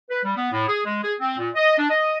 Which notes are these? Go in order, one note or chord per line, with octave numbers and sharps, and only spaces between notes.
B4
G3
B3
A2
G#4
G#3
G#4
C4
A#2
D#5
D4
D#5